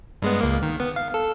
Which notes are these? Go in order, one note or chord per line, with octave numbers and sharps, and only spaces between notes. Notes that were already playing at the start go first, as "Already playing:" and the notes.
G2 G#3 B3
C#2 A#3
D#3
B3
F5
A4